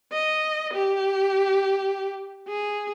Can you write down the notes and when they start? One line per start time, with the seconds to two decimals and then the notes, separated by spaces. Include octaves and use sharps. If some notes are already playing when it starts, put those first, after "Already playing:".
0.12 D#5
0.73 G4
2.48 G#4